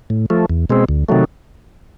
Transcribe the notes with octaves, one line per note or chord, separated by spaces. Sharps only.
A2
F3 A3
E2
B2 G#3 C4
D2
C3 D#3 F#3 A3